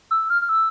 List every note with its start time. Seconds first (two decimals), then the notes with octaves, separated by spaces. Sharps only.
0.11 E6
0.30 F6
0.42 F6
0.49 E6